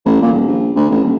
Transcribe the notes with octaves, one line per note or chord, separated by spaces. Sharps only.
A1
A#2
D#1
A#1
D2
A1
D#1